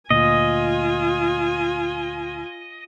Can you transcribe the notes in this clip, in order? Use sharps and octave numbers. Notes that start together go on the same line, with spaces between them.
D2 A#2 F4 D#5 G#5